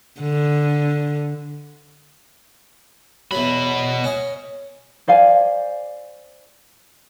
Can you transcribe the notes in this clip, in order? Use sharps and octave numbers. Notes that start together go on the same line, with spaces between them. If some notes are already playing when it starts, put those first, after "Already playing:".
D3
E2 B2 F#3 B5
C#4 D#5
C5 D5 F5 G#5